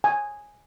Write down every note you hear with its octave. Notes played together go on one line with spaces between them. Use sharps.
G#5